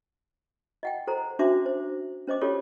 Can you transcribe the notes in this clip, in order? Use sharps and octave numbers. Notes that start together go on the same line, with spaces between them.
D#5 F#5 G5
A4 C5 A#5
C#4 D4 F#4 C5 E5 D6
C5
C#4 C5 D#5 D6
C#4 F4 G4 A4 C#5 D5